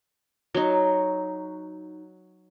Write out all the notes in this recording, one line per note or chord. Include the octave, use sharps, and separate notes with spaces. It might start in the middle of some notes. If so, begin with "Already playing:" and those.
F#3 D#4